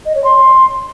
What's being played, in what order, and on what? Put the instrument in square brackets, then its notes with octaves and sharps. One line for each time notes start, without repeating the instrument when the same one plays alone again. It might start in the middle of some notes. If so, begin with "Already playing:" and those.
[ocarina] D#5
C#5
C6